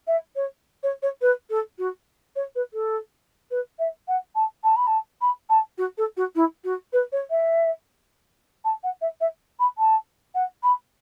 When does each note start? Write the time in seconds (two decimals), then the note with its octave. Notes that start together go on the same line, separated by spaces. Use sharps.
0.07 E5
0.36 C#5
0.83 C#5
1.03 C#5
1.22 B4
1.50 A4
1.79 F#4
2.36 C#5
2.55 B4
2.74 A4
3.51 B4
3.79 E5
4.08 F#5
4.35 A5
4.64 A5
4.76 B5
4.87 A5
5.21 B5
5.50 A5
5.78 F#4
5.98 A4
6.17 F#4
6.36 E4
6.64 F#4
6.93 B4
7.12 C#5
7.30 E5
8.65 A5
8.84 F#5
9.01 E5
9.21 E5
9.59 B5
9.78 A5
10.35 F#5
10.63 B5